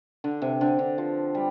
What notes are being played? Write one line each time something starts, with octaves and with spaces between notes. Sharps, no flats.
D3
C3
D3
D3
F3
G3